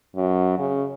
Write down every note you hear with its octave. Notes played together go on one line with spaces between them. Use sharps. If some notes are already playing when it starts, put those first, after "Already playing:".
F#2
C#3